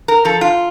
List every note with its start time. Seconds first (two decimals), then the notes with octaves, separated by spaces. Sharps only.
0.08 A#4
0.25 F3 A4
0.41 F4